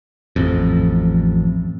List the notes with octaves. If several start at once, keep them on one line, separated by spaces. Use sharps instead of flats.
A1 F2